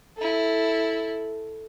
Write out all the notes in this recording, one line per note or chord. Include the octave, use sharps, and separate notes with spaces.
E4 A4